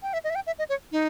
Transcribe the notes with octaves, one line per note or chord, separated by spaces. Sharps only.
G5
E5
D#5
E5
G5
E5
D#5
C#5
D#4